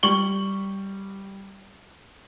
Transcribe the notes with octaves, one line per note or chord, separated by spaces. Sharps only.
G3 C#6 F#7 G7